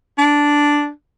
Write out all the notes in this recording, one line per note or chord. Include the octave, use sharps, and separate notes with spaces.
D4